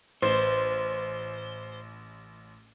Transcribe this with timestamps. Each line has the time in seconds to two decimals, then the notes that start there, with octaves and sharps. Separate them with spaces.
0.22 A1 C5